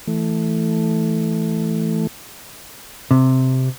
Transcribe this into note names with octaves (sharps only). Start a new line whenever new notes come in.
E3 A3
C3